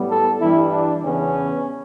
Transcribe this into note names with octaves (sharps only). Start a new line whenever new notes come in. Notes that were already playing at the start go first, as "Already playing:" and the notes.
Already playing: A2 G3 B3
A4
G2 E3 G3 E4
D4
E2 C#3 E3 B3 C#4